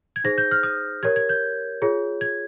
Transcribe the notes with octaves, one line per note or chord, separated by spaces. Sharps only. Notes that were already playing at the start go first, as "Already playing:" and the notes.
G#6
D#4 G#4 C5 A#6
G6
F6
D#6
G4 A#4 C#5 G#6
G#6
G6
F4 G#4 C#5
G#6